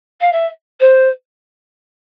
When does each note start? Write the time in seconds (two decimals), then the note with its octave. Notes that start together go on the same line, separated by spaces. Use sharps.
0.20 F5
0.32 E5
0.80 C5